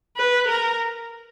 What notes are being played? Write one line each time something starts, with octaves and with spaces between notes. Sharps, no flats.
B4
A#4